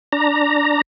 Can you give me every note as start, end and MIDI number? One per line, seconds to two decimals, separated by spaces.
0.13 0.81 62
0.13 0.81 82